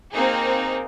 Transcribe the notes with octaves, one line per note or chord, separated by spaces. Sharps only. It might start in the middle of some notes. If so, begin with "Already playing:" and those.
A#3 C4 D#4 G#4